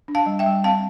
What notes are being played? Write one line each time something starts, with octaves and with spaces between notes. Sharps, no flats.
D4
F5 A5
G3
E5 G5
G3
C4 F5 A5